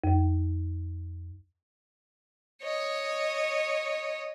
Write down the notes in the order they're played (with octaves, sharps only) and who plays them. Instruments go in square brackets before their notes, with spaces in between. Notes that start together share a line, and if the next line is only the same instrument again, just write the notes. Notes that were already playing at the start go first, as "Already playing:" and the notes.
[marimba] F2
[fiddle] C#5 D#5